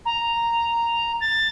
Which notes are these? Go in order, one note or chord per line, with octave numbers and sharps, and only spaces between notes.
A#5
A6